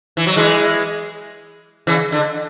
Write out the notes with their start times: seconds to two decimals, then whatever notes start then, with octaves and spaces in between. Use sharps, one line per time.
0.17 E3
0.27 F#3
0.36 E3 G#3
1.87 C#3 E3
2.12 D3